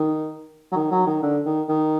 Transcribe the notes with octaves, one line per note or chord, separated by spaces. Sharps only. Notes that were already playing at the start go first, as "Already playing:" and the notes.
Already playing: D#3
F#3
D#3
F#3
D#3
D3
D#3
D#3